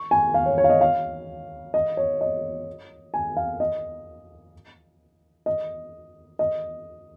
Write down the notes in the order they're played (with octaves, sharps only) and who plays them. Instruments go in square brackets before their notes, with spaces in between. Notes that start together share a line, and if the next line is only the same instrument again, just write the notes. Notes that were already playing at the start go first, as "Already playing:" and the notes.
Already playing: [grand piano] C#6
G#5
F5
C#5
C#5
F5
D#5
F5
D#5
C#5
D#5
G#5
F5
D#5
D#5
D#5